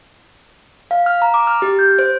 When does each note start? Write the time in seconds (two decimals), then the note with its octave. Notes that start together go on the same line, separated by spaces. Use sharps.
0.91 F5
1.06 F6
1.22 A#5
1.34 D6
1.47 F6
1.62 G4
1.79 G6
1.99 C5